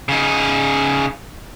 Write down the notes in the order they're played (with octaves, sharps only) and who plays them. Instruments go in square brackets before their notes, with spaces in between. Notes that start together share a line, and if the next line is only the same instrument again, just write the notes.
[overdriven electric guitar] C#3 D#4